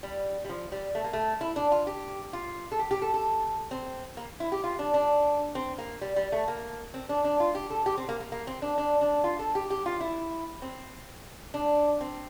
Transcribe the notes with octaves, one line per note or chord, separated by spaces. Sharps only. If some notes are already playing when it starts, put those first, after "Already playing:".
G3
G3
F3
G3
A3
A#3
A3
E4
D4
F4
G4
F4
A4
G4
G4
A4
A4
C4
A#3
E4
G4
F4
D4
D4
C4
A#3
G3
G3
A3
A#3
C4
D4
D4
F4
G4
A4
G4
C4
A#3
A#3
A#3
C4
D4
D4
D4
F4
A4
G4
G4
F4
E4
C4
D4
C4